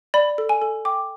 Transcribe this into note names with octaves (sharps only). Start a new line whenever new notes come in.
D5 B5
A4
G#5
A4
G5 D6